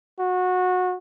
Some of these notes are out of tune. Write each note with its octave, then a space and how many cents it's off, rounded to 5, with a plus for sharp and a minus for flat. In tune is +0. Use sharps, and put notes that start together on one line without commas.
F#4 -20